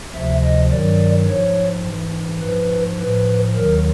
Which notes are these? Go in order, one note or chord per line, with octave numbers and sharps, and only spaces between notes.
D2 C3 F3 E5
D#5
G2 D#3 F#3 D5
G#2 F3 C#5
G#2 E3
G#2 F3 B4
A2 F3 B4
D#2 D#3 F#3 A#4